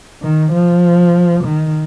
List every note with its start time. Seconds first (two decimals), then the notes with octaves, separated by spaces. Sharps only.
0.22 D#3
0.53 F3
1.44 D#3